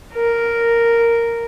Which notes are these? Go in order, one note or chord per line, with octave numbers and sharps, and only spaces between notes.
A#4